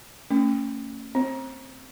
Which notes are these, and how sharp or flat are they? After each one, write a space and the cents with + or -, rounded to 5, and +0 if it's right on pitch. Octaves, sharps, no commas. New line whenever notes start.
A3 +40 C#4 -5
C4 +0 C5 +35